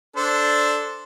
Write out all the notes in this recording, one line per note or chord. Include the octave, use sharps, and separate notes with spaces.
D4 A4 C5